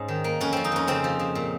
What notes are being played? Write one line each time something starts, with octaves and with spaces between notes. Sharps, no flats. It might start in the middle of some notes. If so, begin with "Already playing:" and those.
Already playing: G#2 C#4
D#3
A#3
F2 C#4
F3 C4
D#4
F2 C#4
C#3 C4
F3
C#3
A#2